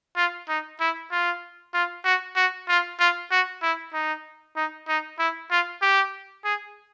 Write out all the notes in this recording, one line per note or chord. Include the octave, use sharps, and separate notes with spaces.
F4
D#4
E4
F4
F4
F#4
F#4
F4
F4
F#4
E4
D#4
D#4
D#4
E4
F4
G4
G#4